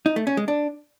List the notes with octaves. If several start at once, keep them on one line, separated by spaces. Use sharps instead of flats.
D#4
A3
C#4
G#3
D4